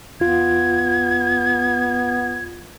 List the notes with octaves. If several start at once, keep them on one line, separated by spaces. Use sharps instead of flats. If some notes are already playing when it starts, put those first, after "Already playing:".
E2 B3 F4 G#6